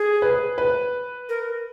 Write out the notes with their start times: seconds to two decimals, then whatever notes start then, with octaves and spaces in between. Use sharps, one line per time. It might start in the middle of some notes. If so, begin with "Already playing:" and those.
Already playing: G#4
0.22 B4
0.58 B4
1.29 A#4